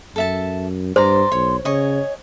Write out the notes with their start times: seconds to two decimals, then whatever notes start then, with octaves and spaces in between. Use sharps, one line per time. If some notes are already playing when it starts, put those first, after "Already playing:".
0.16 F#2 A4 E5 A5
0.96 G2 C5 D5 A#5 C6
1.32 B1 C#5
1.65 C#3 C#5 D#5 G#5 C#6